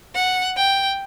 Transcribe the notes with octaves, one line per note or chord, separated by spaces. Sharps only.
F#5
G5